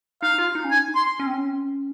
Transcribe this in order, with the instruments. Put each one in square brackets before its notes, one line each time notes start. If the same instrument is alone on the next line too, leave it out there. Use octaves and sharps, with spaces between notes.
[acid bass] D#4 [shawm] F5
[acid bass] F4
D#4
C#4
[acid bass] D#4 [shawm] G#5
[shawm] C6
[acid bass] C#4
C4
C#4